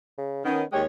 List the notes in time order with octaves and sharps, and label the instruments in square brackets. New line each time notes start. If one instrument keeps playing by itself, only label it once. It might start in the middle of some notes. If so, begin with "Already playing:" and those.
[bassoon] C#3
[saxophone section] D#3 C#4 [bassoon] B3
[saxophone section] D#2 G#3 C#5 [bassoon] G4